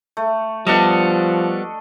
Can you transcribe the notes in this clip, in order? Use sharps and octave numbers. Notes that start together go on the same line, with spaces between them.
A3
F3 G3 B3 D4 A4 D#5